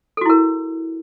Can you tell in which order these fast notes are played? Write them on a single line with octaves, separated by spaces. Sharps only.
A4 F#4 E4 A#4